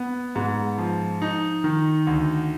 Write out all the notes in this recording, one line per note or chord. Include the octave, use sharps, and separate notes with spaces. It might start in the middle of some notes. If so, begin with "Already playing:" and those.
Already playing: B3
G#2
F3
D#4
D#3
D2